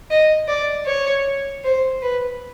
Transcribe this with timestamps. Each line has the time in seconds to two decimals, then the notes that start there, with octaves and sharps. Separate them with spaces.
0.10 D#5
0.48 D5
0.86 C#5
1.64 C5
2.02 B4